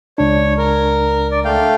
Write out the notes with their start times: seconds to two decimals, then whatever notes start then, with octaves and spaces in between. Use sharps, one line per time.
0.18 C#2 D4 C#5
0.58 A#4
1.31 D5
1.45 A3 F5 G5